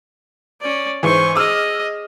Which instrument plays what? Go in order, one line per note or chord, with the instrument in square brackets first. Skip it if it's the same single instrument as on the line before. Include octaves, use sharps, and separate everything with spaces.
[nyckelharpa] C#4 D5
[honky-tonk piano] G#2 E3 [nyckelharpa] C5 C#6
[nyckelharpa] G#4 D#5 [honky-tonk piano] D6 E6 F6